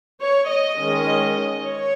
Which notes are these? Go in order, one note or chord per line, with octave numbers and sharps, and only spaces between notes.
C#5
D#5
D#3 G#3 C#4
C#5